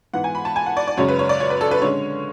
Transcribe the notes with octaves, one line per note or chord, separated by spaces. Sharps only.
G#2 E3 B3 F#5
G#5
B5
A5
G#5
F#5
D5
D5
F#2 C#3 G#3 C#4 C#5
B4
C#5
D5
C#5
B4
A4
B4
D3 G#3 C#4 C#5